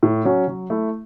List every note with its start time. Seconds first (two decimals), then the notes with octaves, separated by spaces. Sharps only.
0.03 A2
0.25 F#3 C#4 F#4
0.48 F#3
0.70 A3 E4